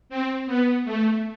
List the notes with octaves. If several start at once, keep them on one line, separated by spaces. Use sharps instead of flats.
C4
B3
A3